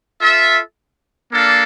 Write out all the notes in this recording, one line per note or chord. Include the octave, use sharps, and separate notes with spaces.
F4 A4 E5
A#3 D4 A4 D5 F5